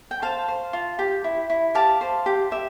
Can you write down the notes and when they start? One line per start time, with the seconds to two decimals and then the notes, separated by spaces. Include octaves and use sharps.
0.11 G5
0.22 C5 F5 A5
0.48 C5
0.73 F4
0.99 G4
1.24 E4
1.50 E4
1.75 G4 F5 A5
2.01 C5
2.26 G4
2.51 G4 E5